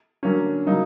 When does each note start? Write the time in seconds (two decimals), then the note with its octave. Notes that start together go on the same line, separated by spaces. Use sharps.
0.23 D3 F#3 A#3 C#4
0.67 C#3 F#3 A#3 D#4